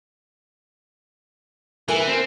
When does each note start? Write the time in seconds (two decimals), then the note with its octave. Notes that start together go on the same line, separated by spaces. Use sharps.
1.88 E3 A#4 G#5
2.07 C4